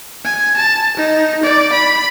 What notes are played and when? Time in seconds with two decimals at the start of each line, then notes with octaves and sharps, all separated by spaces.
0.25 G#5
0.56 A5
0.97 D#4
1.43 D5
1.73 B5